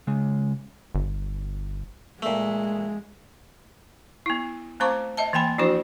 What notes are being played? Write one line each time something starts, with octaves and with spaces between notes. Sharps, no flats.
C#3 G#3
G1
A#2 G#3 A3
B3 E4
A3 C4 C5 A#5 C#6 D6
D#5 E5 A5
E3 A#3 G5 G#5 B5
F3 D4 E4 F#4 C5